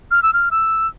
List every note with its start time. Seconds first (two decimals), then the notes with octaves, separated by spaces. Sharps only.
0.11 F6
0.23 E6
0.33 F6
0.51 E6